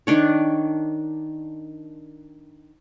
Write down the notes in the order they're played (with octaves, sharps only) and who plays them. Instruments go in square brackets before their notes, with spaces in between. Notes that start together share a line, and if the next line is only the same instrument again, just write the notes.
[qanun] D#3 D4 C#5